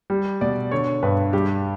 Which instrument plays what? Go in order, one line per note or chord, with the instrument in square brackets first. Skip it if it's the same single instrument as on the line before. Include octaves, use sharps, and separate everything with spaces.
[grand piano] G3
B2 D5
D3 C#5
G2 B4
G3 G4